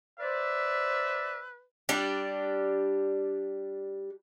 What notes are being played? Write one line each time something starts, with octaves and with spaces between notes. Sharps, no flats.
B4 C5 D5 E5
G3 D4 G4